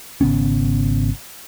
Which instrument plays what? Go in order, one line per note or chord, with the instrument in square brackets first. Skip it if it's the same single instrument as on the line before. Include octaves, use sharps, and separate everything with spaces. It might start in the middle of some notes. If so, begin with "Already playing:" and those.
[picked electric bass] G#1 C#3 B3 C#4